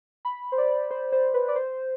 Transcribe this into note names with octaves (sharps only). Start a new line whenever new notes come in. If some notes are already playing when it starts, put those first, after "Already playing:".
B5
C5
D5
C5
C5
B4
D5
C5